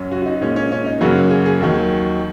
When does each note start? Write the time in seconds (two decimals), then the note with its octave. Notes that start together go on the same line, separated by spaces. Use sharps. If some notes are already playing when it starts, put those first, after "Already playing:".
Already playing: F#2 F#3 C#4
0.12 F#4
0.22 F#4
0.26 D#4
0.41 A#2 G#3 C#4
0.56 C#4
0.72 C#4
0.86 D#4
1.01 F#2 C#3 F#3 A#3 C#4 F#4
1.31 G#4
1.46 G#4
1.61 D#2 D#3 F#3